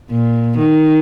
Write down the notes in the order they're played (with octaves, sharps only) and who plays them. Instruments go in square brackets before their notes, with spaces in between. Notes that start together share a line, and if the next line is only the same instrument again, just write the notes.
[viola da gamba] A#2
D#3